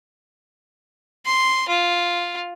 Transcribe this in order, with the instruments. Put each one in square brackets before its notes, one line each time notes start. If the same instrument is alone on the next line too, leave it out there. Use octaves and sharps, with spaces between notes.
[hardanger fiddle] C6
F4